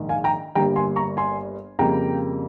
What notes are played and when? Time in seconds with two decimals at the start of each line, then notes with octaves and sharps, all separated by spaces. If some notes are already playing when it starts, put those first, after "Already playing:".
Already playing: A#1 G#2 D#3
0.09 F5 G#5
0.24 G5 A#5
0.55 G1 G2 G3 A#3 G5 A#5
0.76 G#5 C6
0.96 A#5 C#6
1.17 G#5 C6
1.79 F2 C#3 G3 A#3 G5 A#5